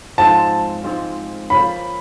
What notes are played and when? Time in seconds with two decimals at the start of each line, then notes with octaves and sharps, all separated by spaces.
0.18 G#2 F3 G#3 C4 A5
0.84 G#2 F3 G#3 C4
1.50 F3 A#3 C#4 B5